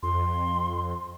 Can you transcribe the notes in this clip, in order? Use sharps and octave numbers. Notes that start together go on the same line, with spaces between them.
F2 C6